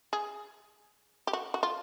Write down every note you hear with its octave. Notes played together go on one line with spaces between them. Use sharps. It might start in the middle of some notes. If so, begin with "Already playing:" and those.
G#4
G4
F#4
F#4
F4